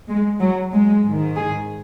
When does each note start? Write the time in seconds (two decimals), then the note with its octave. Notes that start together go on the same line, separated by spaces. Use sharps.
0.09 G#3
0.40 F#3
0.73 G#3
1.05 G#2 D#3
1.36 G#4